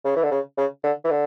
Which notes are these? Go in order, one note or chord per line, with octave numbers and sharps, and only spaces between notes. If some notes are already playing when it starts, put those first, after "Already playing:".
C#3
E3
D3
C#3
C#3
D3
E3
D3